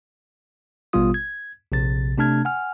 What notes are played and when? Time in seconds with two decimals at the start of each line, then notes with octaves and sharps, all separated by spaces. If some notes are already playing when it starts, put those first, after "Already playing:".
0.93 A1 B2 G3 B3 F4 D#6
1.14 G#6
1.72 A#1 C3 A6
2.18 C3 A3 D4 A5 F6 G#6
2.45 F#5 G#5 F6